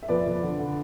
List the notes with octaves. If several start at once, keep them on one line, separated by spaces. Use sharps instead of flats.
E5
F2 B4 D5
F2
D3
D3